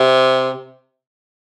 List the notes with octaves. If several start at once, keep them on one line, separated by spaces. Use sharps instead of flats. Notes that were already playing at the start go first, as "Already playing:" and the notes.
Already playing: C3